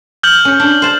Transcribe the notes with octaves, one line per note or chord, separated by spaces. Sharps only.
F6 G6 F#7
C#4
D4
C5 A5